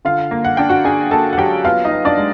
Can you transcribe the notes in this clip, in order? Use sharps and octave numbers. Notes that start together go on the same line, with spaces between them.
D3 F4 F5
A#3
F#5
D4 G5
F#4 F#5
D4 G#4 G#5
A#3 A4 A5
F#5
F#3 G4 G5
B3 F4 F5
D#4 D#5
B3
D4 D5
G#3